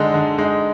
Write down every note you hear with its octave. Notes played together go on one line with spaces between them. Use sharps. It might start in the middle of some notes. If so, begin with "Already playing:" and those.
Already playing: D3 G#3 D#4
D3
G#3 D#4